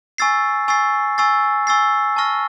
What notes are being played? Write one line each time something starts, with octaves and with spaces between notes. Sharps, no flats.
G#5 C#6 E6 A6 C7
G#5 C#6 E6 A6 C7
G#5 C#6 E6 A6 C7
G#5 C#6 E6 A6 C7
A5 C#6 F6 A#6